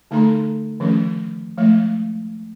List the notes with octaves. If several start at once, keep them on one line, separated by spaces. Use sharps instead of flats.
D3 A3 D#4 A4 A#5 C6
D#3 F3 A3 C#4
F3 G#3 A3 F5